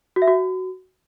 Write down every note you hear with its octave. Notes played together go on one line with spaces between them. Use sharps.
F#4
E5
F#4